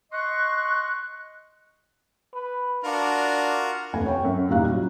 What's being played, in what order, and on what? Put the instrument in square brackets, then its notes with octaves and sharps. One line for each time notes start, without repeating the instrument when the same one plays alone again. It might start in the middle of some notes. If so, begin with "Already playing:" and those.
[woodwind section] D#5 C6 C#6 [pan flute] F#6
[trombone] B4
[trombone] D4 [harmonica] F4 F#4 A#4
[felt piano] F1 D2 G#5
C#5 G5 C#6
F#2
E2 A#2 G3 D#4 F5 F#6
F#3 C#4